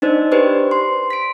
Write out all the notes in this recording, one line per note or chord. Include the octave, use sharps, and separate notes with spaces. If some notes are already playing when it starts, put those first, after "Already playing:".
D4 D#4 C5 D5
G4 B4 C5 D5
C6
B6 D7